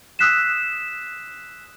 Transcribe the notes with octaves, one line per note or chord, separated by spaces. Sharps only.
D#6 E6 F#6 B6 C7 E7